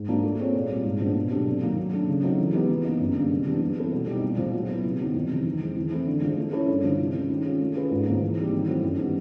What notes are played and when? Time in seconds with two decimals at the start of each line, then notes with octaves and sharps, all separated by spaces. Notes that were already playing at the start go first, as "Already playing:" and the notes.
Already playing: G#2
0.08 F3 A#3 D4 F#4
0.23 A3
0.39 C4 F4 G#4 C#5
0.55 A#2
0.70 G3 C4
0.85 G#2
1.00 F3 G#3 B3 D4
1.15 B2
1.31 F#3 A3 D4 G4
1.46 C3
1.62 D#3 F#3 A#3
1.77 F#3
1.93 A3 D4
2.08 C#3
2.23 F#3 A3 C4 D#4
2.39 E3
2.54 G#3 B3 D#4 G4
2.69 F#3
2.85 A#3 D#4
3.00 F#2
3.15 D3 G3 A#3
3.30 C3
3.46 E3 G3 B3 D4
3.61 G3
3.77 C4 E4 A4
3.93 B2
4.07 G3 C4 D#4
4.22 A#2
4.38 F3 G#3
4.54 F#3
4.68 B3 E4
4.84 C3
4.99 D#3 F#3
5.14 F2
5.29 C3 E3
5.45 D#3
5.61 G#3 C4
5.76 E3
5.91 A3 C4 E4
6.07 D3
6.22 F3 G#3
6.38 A3
6.53 C#4 E4 A4 C#5
6.68 G2
6.84 D3 F3
6.99 C3
7.14 F3 G#3 C#4
7.30 D#3
7.45 G#3 C#4 F4 G#4
7.61 A3
7.75 C#4 F4 G#4 B4
7.91 G#2
8.06 F3 A#3
8.22 E3
8.37 G3 C4 D#4
8.52 D#3
8.67 F#3 A3 C4 E4
8.83 F#2
8.99 D#3 G3 B3